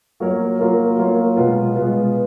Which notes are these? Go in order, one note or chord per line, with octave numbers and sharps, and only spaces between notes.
F#3 A#3 F4 A#4 C#5
F#3 A#3 F4 A#4 C#5
F#3 A#3 F4 A#4 C#5
B2 G#3 B3 F4
B2 G#3 B3 F4